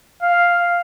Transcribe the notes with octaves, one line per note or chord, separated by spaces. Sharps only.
F5